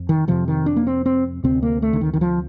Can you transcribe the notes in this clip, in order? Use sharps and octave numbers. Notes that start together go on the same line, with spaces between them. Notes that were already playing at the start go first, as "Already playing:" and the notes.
Already playing: F2
D#3
F2 C3 F3
D#3
D4
A#3
C4
C4
D2 C3 C4
A#3
A3
D3
D#3
D#3
F3